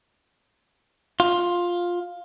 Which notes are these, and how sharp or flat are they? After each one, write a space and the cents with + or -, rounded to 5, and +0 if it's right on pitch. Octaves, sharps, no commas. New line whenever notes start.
F4 +10